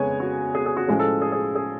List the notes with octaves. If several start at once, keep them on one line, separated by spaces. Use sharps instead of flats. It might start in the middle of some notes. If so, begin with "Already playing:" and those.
Already playing: F2 C#3 G#3 B3 C#5 G#5
F#4
G#4
G#4
F#4
A2 F3 G#3 C#4 G#4
A4
G#4
G#4
G#4